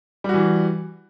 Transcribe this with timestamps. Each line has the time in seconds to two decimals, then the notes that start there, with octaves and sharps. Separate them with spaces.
0.24 G3
0.29 F#4
0.34 E3